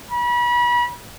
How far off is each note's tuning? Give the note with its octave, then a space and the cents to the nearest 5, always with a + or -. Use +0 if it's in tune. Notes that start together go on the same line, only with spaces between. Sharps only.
B5 -35